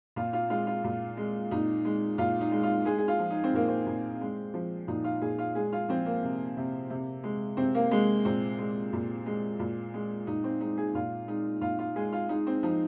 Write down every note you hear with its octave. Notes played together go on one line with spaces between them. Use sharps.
A#2 F4
F4
G#3 F4
F4
A#2
G#3
A#2 D#4
G#3
A#2 F4
D#4
G#3
F4
G#3 G#4
G#4
F4
F3
D#4
C4
A#2 A#3
C4
A#2
G#3
F3
A#2 D#4
F4
A#2 G#4
F4
G#3 G#4
F4
F3 C4
A#3
C3
C3
C3
G#3
C3 C4
A#3
G#3
A#2 C4
G#3
A#2
G#3
A#2
G#3
A#2 D#4
C4
G#3 D#4
G#4
A#2 F4
G#3 D#4
A#2 F4
F4
G#3 G#4
F4
G#3 D#4
C4
F3 D#4